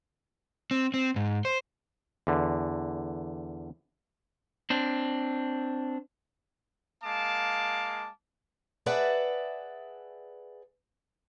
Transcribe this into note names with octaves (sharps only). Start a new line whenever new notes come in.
C4
C4
G#2
C5
E2 D3
C4 D4
G#3 A#3 F5 A5 D6
G#4 B4 D5 E5 F#5 A5